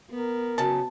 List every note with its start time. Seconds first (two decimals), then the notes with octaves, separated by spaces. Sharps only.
0.11 B3 A#4
0.58 C#3 F#3 C#4 A5